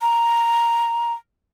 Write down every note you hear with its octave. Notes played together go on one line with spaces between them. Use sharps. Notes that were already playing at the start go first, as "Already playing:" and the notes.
A#5